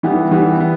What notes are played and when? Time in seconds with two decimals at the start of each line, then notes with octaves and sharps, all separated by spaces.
0.03 E3 G3 B3
0.31 E3 G3 B3
0.60 B3